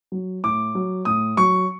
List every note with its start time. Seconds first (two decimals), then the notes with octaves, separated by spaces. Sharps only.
0.12 F#3
0.44 A2 D6
0.75 F#3
1.05 A2 D#6
1.37 F#3 C#6